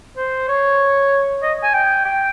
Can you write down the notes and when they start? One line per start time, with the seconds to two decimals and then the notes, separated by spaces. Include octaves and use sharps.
0.17 C5
0.48 C#5
1.42 D#5
1.63 G#5
1.74 G5
2.05 G5